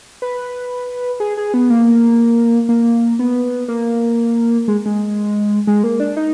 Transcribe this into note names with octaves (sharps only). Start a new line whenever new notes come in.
B4
G#4
G#4
B3
A#3
A#3
B3
A#3
G#3
G#3
G#3
A#3
D4
D#4